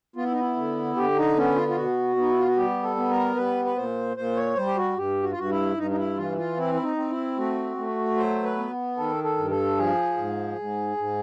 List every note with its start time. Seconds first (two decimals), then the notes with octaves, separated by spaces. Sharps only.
0.16 B3 F4
0.25 E4
0.32 D#4
0.40 E4
0.56 D3
0.96 D3 G4
1.17 D#4
1.36 B3 C#4
1.56 F4
1.68 F4
1.76 B2 F#4
2.16 B3 D#4
2.30 E4
2.38 F4
2.48 F#4
2.56 G3 G4
2.83 A4
2.96 B3
3.10 A#4
3.36 G3 B4
3.65 B4
3.77 A#2 C5
4.17 A#2 C5
4.37 C#5
4.56 G3 C5
4.66 G4
4.77 F#4
4.96 G2 G4
5.23 F#4
5.31 F4
5.37 G2 F#4
5.51 E4
5.77 G2 D#4
5.91 D#4
5.97 E4
6.16 E3 F4
6.31 E4
6.37 F4
6.57 C4 E4
6.74 E4
6.83 D#4
6.96 C4
7.10 E4
7.38 A3 F#4
7.77 A3
8.16 F#3 C5
8.43 B4
8.57 B3
8.97 D#3 A4
9.24 A4
9.38 G2
9.51 A4
9.77 F3 G#4
10.17 G#2
10.58 G#2
10.97 G#2